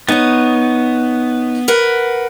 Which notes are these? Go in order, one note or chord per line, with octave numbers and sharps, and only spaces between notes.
B3 D#4 C#5
A#4 B4 F#5